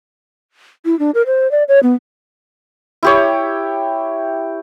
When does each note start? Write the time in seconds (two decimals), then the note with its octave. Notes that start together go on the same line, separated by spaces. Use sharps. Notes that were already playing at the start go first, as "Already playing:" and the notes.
0.85 E4
0.99 D4
1.15 A#4
1.27 C5
1.51 D5
1.68 C#5
1.83 B3
3.03 E4 G4 C#5